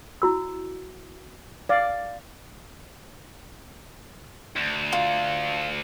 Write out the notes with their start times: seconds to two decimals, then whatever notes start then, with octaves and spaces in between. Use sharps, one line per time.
0.22 E4 F#4 E6
1.69 D5 F5
4.56 D2
4.92 F4